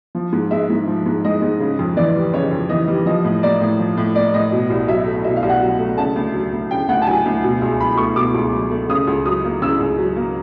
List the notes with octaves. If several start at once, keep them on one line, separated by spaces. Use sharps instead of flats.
F3
G#2
G#3 E5
G#2
F3
G#2
G#3 D#5
G#2
C#3
F2
E3 D5
G3
C#3 C#5
F2
E3 D#5
G3
F3 D#5
A2
A#3 D5
A2
F3
A2
A#3 D5
A2 D#5
B2
C2
F#3 E5
A3
B2 E5
F5
C2
F#5
F#3
A3
C#3 A5
D2
F#3
D2
C#3 G5
D2 F#5
A5
F#3 G#5
D2
B2
C#2
F#3 B5
A3 C#6
B2 D6
C#2
F#3
A3
C#3 D#6
C#2
F#3 D#6
A#3
C#3 E6
C#2
F#3
A#3